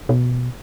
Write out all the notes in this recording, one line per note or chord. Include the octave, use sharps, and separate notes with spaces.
B2